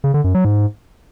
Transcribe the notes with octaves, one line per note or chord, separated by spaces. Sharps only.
C#3
D3
F#2
F#3
G#2